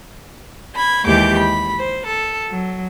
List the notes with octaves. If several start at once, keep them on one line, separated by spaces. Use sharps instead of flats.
B5 G#6
D#2 E3 G#3 G4 D6 G6
B5
C5
A4
F#3